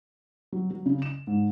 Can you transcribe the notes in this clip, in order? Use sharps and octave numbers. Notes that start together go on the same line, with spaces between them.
F#3
F#3
C#3
E7
G#2